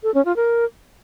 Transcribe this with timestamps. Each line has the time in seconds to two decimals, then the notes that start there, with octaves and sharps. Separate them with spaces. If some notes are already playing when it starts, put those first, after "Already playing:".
0.03 A4
0.14 C#4
0.25 F4
0.36 A#4